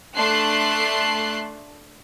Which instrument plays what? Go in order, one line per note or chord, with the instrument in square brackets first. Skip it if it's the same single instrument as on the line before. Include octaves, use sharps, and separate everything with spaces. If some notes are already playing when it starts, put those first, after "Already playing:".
[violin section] A3 D4 A5 C6 F#6 C7